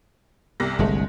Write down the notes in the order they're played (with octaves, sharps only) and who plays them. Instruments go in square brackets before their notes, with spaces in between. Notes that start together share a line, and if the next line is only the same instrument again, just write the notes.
[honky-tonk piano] C2 C3 A#6
[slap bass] G1 C2 [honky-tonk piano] G#3 A3